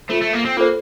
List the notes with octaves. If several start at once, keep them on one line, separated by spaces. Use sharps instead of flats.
A3 F4 A4 C5
A3
A#3
C4
A#3 F4 A4 C5